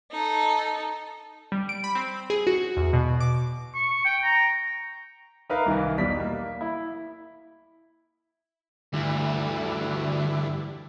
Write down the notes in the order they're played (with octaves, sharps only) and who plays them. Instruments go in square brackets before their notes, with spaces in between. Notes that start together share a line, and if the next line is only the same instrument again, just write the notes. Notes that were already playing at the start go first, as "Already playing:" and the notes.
[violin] D#4 A4
[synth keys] G3
D7
B5
C4
G#4
F#4
E2
B2
D6
[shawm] C#6
G5
A#5
[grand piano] D#4 A#4 B4 E5 F5
C2 D#3 E3
B1 E2 B2 G3 D5 B6
A#3
E4
[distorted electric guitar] D2 [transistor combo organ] G2 D3 E3